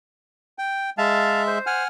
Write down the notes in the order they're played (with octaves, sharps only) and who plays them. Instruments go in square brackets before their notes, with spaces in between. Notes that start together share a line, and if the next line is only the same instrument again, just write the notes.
[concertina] G5
[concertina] G#3 E5 [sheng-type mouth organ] F5 A5
[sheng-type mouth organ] C5
[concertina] F#5 G#5 F6